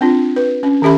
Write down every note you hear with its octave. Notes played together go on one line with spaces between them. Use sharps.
C4 D4 F4
B4
C#4
D#3 C#4 G4 E5 B5